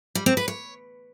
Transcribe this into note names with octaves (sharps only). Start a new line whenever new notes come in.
G3
C4
B4
C#5